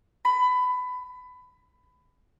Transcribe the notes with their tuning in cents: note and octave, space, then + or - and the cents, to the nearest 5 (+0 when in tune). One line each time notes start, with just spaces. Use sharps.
B5 +20